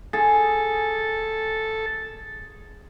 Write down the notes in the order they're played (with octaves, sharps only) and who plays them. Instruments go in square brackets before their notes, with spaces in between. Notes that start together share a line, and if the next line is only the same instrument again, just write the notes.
[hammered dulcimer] G#4 [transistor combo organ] A4